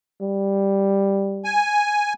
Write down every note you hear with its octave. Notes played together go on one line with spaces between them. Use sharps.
G3
G#5